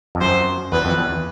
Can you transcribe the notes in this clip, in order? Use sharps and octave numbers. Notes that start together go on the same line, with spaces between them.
F2
F#2 C5
E2 B4
F2
E2